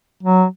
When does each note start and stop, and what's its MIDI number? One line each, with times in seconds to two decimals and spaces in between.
0.23 0.45 54